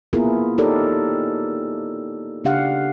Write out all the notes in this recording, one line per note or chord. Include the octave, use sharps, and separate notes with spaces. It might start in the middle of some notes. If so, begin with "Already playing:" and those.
A#3 B3 E4 F4 G#4 A#4
D#4 G4 A4 A#4 C#5 D5
C#3 D4 G4 F5 F#5